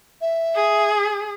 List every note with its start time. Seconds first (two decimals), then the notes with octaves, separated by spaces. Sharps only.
0.21 E5
0.55 G#4